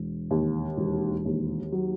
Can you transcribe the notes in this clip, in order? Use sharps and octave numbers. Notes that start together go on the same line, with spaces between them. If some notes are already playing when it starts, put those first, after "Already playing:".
Already playing: E1
D#2
E1
D#2
F#3